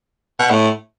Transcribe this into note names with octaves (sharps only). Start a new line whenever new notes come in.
B2
A2